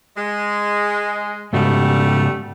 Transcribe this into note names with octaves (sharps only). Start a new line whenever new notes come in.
G#3
G#2 C#3 G3 A3 F#4